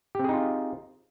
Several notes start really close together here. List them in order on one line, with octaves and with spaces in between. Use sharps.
G4 C4 G#4 D#4 F4